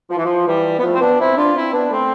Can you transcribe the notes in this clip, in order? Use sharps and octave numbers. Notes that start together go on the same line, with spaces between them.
F3
E3
F3
E3 G3
B3
F3 A3
C4
B3 D4
C4 E4
D4 F4
C4 E4
B3 D4
A3 C4